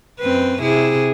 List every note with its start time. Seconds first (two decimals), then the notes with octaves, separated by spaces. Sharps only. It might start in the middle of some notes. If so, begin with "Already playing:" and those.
0.20 F#2 C4 B4
0.62 C3 E4 G#4